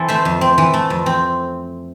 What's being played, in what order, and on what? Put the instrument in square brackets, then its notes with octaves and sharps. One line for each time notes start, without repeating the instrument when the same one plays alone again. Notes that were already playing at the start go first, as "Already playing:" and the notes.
Already playing: [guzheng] E3 C4 A4
A3 C5 E5
F2
C4
E3
A3
F2
C4